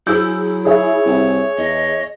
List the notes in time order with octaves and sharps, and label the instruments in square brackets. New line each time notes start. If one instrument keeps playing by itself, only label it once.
[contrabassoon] F#3 [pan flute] E4 [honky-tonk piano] G#4 E6 G6
[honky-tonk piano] G#4 E5 [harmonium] C#5
[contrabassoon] C2
[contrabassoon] E2 [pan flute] D#5